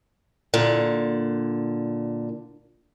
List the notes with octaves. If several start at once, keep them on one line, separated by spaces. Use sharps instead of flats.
A#2 D3